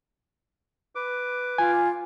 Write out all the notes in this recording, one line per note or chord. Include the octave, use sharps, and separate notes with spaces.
B4 D6
F4 G#5